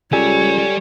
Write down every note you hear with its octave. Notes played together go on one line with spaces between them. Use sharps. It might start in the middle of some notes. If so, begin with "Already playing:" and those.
C#2 G3 G4 A4 C#5 D5 G#5